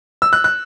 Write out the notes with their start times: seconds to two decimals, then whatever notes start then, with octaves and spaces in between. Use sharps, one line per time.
0.22 E6
0.33 F#6
0.44 F#6